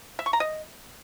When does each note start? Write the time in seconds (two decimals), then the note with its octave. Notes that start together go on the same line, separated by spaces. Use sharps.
0.19 E5
0.26 C#6
0.33 A#5
0.40 D#5